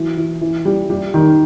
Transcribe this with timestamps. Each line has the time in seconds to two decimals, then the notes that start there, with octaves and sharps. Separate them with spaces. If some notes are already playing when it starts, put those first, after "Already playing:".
Already playing: E3 F#3
0.17 E3
0.41 E3
0.65 G3
0.90 G3
1.14 D#3